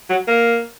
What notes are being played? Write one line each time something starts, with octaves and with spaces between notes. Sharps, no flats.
F#3
A#3